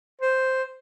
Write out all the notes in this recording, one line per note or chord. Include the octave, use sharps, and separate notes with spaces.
C5